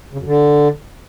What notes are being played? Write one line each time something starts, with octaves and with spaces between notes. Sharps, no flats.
C#3
F#2
D3